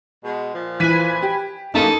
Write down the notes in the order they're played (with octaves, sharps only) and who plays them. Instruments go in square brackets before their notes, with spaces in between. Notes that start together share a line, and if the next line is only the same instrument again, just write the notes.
[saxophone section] B2 G#3
A#2 F3
[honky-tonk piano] E3 B6 D#7 [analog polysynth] B4 G#5
[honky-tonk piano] G4
[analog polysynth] F#2 A#3 [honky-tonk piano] D#4 D#7 [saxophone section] E4 G#4 A4